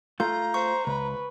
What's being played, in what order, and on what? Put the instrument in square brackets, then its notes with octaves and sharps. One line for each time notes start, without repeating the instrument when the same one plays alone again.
[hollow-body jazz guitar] A3 F4 [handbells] F5 G6 [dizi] A#5
[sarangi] C5 [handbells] C#6
[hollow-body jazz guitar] C#2 [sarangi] B4